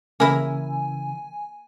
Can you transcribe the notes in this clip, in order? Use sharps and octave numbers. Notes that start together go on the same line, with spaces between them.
C#3 E3 A#3 E4 G#5